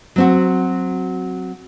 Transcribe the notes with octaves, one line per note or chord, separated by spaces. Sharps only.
F#3 C4 F#4